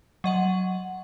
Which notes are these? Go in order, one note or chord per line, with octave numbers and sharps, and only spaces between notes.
F#3 D#5 F#5